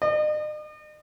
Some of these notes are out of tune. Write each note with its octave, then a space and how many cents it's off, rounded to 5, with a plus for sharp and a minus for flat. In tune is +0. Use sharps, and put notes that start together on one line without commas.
D#5 -45